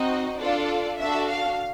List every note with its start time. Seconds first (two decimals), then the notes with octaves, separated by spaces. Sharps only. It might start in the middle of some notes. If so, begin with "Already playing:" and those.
Already playing: C4 D#4 F#4 D#5
0.41 D4 F4 A4 D5
1.00 D4 F#4 A4 E5
1.30 F5